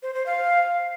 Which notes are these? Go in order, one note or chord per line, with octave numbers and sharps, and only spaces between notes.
C5
C5
F5